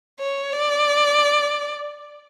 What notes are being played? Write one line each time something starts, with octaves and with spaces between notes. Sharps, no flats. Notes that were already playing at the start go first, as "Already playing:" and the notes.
C#5
D5